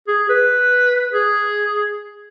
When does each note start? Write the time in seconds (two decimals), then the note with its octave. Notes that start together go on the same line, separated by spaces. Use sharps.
0.08 G#4
0.29 B4
1.13 G#4